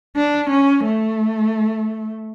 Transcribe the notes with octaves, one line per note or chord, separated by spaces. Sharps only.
D4
C#4
A3